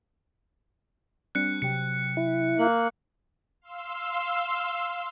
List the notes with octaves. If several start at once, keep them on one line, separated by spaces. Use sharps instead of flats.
G3 C4 D4 F#6 C#7
C3 F#3 G5 C#7
E4
A#3 F#6
F5 C6 E6